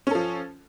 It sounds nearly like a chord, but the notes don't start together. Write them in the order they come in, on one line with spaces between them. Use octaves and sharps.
C#4 A4 F3